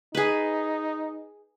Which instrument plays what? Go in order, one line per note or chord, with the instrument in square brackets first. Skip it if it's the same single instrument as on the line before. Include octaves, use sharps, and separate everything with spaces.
[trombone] D#4 [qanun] G#4 B4